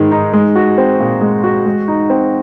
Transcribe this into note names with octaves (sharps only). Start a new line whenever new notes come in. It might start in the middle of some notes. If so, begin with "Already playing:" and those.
Already playing: G#2 D#3 G#3
D#4
G#3
F#4
C4
A#2
G#3
F#4
G#3
D#4
C4